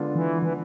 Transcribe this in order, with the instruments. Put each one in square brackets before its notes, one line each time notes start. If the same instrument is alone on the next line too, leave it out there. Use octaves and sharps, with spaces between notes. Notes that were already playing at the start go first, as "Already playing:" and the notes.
Already playing: [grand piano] D3 G#3 B3 D4 F4
[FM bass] E3
E3